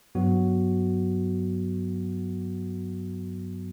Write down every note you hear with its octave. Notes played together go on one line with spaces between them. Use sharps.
G2 F#3 B3 F#4